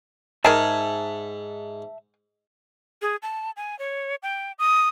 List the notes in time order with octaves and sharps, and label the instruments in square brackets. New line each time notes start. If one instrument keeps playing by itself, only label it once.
[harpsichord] G#2 [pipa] G#4 A#4 G#5 [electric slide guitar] E5 A5
[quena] G#4
A5
G#5
C#5
G5
D#6